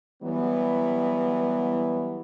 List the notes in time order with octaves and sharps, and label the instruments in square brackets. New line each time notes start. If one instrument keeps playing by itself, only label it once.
[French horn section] E3 F#3 G3 B3